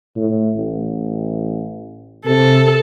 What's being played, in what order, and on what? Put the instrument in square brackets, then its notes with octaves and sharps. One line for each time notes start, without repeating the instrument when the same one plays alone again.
[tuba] A2
A1
[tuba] C3 [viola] A4